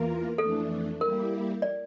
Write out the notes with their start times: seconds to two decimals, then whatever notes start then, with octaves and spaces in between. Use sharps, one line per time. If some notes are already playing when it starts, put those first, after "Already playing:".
Already playing: E2 E3 A#3 F4 A#4
0.38 F2 E3 A3 D4 A4
1.01 G3 A#3 E4 G4 A#4
1.62 D5